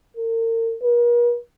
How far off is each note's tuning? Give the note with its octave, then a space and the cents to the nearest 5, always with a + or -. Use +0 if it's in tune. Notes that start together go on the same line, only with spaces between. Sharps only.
A#4 -40
A#4 +45